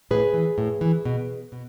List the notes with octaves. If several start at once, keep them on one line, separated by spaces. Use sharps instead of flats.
A2 G#4 B4
E3
A2
E3
B2
B2